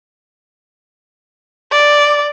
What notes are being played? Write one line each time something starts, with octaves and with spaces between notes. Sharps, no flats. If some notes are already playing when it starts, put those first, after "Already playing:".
D5